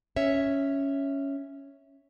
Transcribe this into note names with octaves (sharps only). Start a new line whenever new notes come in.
C#4 C#5 E5